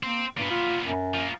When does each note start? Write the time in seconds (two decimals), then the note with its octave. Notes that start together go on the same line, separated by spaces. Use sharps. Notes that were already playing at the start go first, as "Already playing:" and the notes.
0.03 A#3 C4
0.37 G2 A#2 B3
0.50 F4
0.85 F#2
1.14 F3 A#3